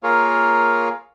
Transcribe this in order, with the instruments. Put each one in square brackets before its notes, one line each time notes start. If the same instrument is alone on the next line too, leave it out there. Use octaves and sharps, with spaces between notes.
[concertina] A#3 F4 G#4 A#4 C#5